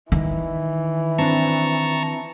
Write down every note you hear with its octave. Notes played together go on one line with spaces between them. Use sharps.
D#3 E3
C4 D4 A5 A#5 C#6